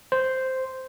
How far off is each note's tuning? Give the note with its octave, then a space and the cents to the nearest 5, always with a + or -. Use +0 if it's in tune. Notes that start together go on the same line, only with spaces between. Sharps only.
C5 -5